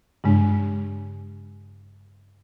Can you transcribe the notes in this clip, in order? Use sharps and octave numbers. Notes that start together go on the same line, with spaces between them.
G2 C#3 G#3 D4